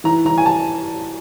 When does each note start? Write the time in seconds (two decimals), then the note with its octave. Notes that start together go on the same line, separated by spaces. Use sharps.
0.04 E3 A#5
0.25 E3 A#5
0.38 G#5
0.46 A5